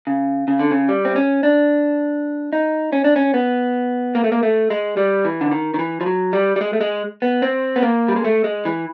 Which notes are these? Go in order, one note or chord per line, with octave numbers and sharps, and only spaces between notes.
C#3
C#3
D3
C#3
G3
C4
C#4
D4
D#4
C#4
D4
C#4
B3
A#3
A3
A#3
A3
G#3
G3
E3
D3
D#3
D#3
E3
F3
F#3
G3
G3
G#3
A3
G#3
B3
C4
B3
A#3
G3
G#3
A3
G#3
E3